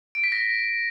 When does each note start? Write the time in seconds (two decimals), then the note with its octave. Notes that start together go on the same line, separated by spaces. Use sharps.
0.15 D7
0.24 B6
0.32 A#6